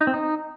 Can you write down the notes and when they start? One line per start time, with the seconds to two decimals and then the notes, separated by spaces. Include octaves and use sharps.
0.01 D#4
0.07 C4
0.14 D#4